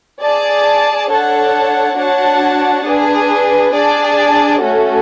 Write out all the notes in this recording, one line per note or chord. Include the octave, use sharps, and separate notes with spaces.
G#4 D5 A5
D4 A4 C#5 F#5 A5
D4 F#4 C#5 F#5 A5
D4 G#4 B4
D4 G#4 D5 A5
A3 C#4 F#4 A4